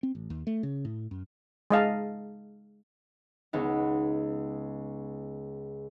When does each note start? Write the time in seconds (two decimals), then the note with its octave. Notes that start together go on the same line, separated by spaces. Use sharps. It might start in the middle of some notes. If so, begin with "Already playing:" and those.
0.03 C4
0.15 A1
0.30 D#2
0.47 A3
0.63 C#3
0.85 A2
1.11 F#2
1.71 G#3 D#5 F5 A5
3.53 C#2 B3 D#4